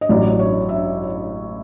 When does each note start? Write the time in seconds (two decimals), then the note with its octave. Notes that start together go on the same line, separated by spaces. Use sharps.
0.01 D#5
0.09 A1 A2 F#3 D5
0.39 C#5
0.69 E5